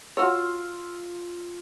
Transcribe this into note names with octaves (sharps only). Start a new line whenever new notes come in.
F4 F#4 C#5 E6